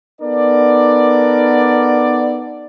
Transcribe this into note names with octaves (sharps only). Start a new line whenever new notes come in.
B3 D#4 A4 A#4 D5